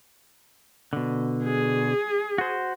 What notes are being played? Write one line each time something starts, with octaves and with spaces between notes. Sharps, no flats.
B2 D3
G#4
F#4 C5